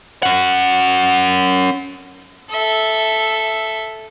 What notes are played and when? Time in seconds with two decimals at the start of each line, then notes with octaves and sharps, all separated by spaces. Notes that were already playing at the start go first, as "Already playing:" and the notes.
0.23 C#4 F#5
2.51 A4 E5